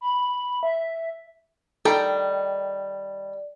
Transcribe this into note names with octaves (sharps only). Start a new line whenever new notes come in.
B5
E5
D#3 G3 A4 D5 G5